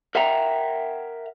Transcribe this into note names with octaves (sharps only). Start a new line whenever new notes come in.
A#4 E5 F#5 G5 A#5